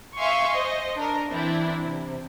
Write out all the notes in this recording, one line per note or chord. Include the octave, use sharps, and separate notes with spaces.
E5 F5 G#5 C6 C#6
C5 D#5
D4 A#4
E3 C4 D4 E4
C3